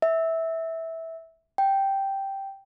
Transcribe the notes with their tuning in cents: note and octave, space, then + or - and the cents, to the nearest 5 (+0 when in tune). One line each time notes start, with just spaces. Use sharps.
E5 -15
G5 -5